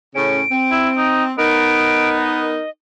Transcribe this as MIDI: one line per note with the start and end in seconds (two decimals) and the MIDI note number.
0.15 0.42 45
0.15 0.42 49
0.15 0.42 61
0.15 1.07 98
0.51 1.32 60
0.71 0.89 64
0.97 1.24 63
1.38 2.59 59
1.38 2.63 63
1.38 2.63 70
1.38 2.10 98
2.18 2.70 75